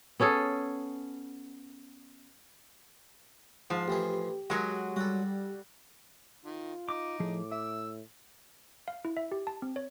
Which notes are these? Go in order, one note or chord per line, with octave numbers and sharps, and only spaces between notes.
B3 C#4 G#4 A4
G#2 F3
A1 E3 G4 G#4
F#3 G#3 F#4 A#4
G3 F#4 A4
D#3 F4
D#4 D6
A2 F3 G#4
E5 E6
F5
E4
E5
G4
A5
C4
C#5